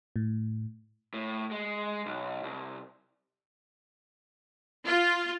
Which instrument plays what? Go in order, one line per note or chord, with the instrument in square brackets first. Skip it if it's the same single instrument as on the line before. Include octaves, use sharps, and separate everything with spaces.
[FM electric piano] A2
[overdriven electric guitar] A2
G#3
B1
C2
[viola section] F4